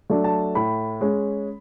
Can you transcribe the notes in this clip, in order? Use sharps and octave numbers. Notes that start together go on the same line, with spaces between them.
F#3 A3 D4
A5
A2 B5
G#3 C#4